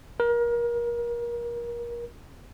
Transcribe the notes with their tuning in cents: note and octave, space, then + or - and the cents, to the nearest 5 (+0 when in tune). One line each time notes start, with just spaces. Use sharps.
A#4 +30